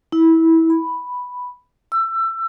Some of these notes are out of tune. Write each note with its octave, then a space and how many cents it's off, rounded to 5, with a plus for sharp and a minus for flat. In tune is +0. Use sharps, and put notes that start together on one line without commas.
E4 -20
B5 +0
E6 +25